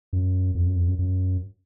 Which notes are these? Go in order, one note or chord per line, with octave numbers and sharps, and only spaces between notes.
F#2
F2
F#2
F2
F#2
F#2